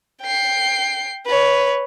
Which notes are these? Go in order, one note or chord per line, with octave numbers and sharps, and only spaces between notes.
G5 C7
B4 C#5